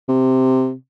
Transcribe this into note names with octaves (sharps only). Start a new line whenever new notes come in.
C3